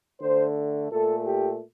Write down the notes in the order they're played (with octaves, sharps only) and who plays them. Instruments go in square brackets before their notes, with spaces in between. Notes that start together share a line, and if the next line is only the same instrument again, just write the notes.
[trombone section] D3 A3 C5
A#2 A3 A4
G4